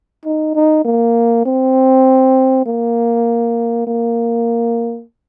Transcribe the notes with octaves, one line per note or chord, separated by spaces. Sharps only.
D#4
D#4
A#3
C4
A#3
A#3